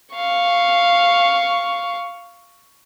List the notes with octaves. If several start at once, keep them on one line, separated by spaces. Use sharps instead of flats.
F5 C#6